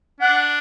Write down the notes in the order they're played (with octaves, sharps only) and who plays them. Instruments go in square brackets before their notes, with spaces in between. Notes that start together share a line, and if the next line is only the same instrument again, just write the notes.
[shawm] D4 [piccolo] F#5